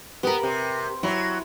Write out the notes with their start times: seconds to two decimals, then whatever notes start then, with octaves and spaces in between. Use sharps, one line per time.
0.23 B3 G4 A#4
0.43 C3
1.03 F#3 E4